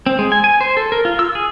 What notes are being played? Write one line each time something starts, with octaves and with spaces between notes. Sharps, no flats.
C4
G#3
G#5
G#5
C5
A4
A#4
F4
E6
G#4